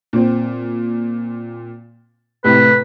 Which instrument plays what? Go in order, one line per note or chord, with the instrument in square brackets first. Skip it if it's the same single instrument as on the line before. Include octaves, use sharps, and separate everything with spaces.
[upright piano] A#2 C4
[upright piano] A2 C3 [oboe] B4